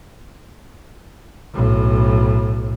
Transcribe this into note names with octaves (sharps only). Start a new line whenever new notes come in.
B1 A2